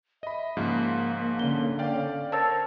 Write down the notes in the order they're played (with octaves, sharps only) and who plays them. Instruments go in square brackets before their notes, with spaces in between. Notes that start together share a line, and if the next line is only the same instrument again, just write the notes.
[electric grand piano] D#5 B5 [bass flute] E5
[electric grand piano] G#2 C#3 F3 [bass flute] A#3
[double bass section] D3 C#4 [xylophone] G7
[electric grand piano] D5 F5 G5
[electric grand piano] A#4 C5 C#5 [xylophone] A5 E6 A6